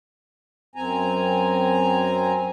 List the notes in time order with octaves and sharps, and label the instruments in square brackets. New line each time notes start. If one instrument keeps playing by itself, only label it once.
[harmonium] F#2 C4 G#5 A#5